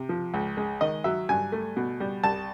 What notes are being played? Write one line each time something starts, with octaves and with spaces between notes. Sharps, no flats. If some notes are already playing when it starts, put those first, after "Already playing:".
Already playing: C3
F3
C#2
G#3
D#3 D#5
F#3 E5
G2 G#5
A3
B2
G3
C2 A5